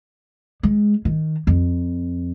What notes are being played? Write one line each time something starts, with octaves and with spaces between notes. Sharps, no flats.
G#3
D#3
F2